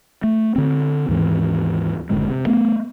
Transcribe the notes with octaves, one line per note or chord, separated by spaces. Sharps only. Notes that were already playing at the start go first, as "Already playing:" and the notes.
A3
D3 C4
D#2 G#2 E3 C4
F#1 A2 D3 G#3
C3
A3 B3